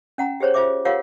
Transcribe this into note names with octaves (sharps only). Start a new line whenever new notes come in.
C#4 F#5 A#5
G4 G#4 C5 C#5
F4 C5 E5 D6
F4 G4 A#4 C#5 F5 F#5